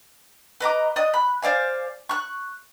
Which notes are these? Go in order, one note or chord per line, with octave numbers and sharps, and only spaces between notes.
B4 D#5 A#5 D6
D5 D#5 D#6 F#6
B5 F#6
C5 D5 F5 G#5
C#6 F#6